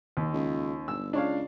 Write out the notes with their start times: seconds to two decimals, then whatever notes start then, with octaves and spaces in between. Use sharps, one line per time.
0.17 D#2
0.33 C#2
0.88 G1 E6
1.13 C#2 D4 C#5 F5